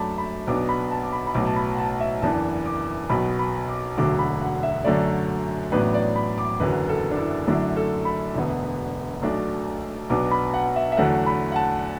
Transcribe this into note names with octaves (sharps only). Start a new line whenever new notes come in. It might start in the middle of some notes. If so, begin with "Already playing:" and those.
Already playing: F#2 F#3 A3 D4 A5 B5 D6
B5
B1 B2 B3 D4 D6
B5
A5
D6
B5
B5
B1 A2 F#3 B3 D6
A5
B5
F#5
A5
E5
F#1 E2 E3 D4 A5
D6
B1 B2 B3 B5
B5
D6
E1 D2 D3 F#3 D6
B5
F#5
E5
F#2 D3 F#3 A3 D5
A1 A2 F#3 B3 D4 B4
D5
B5
D6
F#1 E2 D3 F#3 B4
A4
D4
E4
F#2 D3 F#3 A3 D4 E4
A4
B5
E1 D2 D3 B3
B1 B2 A3 D4
B1 B2 B3 D4 D6
B5
F#5
E5
E5
E2 D3 F#3 A3 F#5
B5
F#5
A5